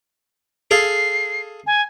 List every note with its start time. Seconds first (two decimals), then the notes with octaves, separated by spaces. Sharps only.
0.71 G#4 A4 F5 C7
1.67 G#5